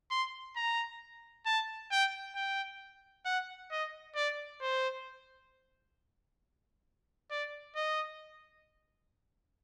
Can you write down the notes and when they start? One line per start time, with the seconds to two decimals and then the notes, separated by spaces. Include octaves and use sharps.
0.11 C6
0.56 A#5
1.46 A5
1.91 G5
2.35 G5
3.25 F#5
3.72 D#5
4.16 D5
4.61 C5
7.31 D5
7.76 D#5